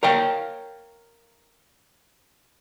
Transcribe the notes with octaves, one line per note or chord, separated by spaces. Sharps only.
A#4 C#5 F5 G5